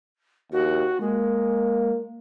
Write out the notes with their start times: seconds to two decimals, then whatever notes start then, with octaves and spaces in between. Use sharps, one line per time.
0.52 D#2 F#4
1.01 G#3 A#3